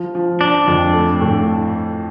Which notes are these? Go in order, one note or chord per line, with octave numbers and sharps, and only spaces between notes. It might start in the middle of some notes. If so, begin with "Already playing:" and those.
Already playing: F3
F3
F3 D4
F2
A3
A2